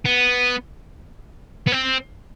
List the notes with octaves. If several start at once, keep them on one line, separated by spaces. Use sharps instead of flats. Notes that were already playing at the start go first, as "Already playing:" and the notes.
B3
B3
C4